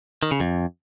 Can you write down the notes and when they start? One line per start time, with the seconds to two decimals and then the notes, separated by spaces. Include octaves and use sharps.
0.23 D#3
0.31 C#3
0.40 F2